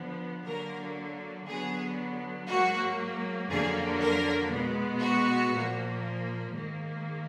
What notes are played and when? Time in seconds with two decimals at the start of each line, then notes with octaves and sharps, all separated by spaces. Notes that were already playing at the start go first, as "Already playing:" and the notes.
Already playing: D3 F3 B3
0.46 D3 F#3 A#3 A#4
1.47 D3 F#3 B3 G#4
2.48 G#2 F#3 A#3 F#4
3.50 F2 D3 F#3 A#3 G#4
4.00 A#4
4.51 B2 G#3 B3
5.01 F#4
5.51 A#2 F3 A#3
6.53 G#2 D#3 A#3